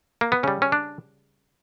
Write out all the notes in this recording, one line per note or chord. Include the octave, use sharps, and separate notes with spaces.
A#3
B3
C#3 G3 C#4
C#4
D4